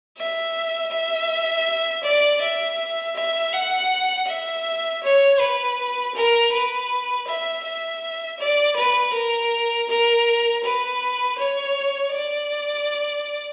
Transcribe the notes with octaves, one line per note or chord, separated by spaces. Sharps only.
E5
E5
D5
E5
E5
F#5
E5
C#5
B4
A#4
B4
E5
E5
D5
B4
A#4
A#4
B4
C#5
D5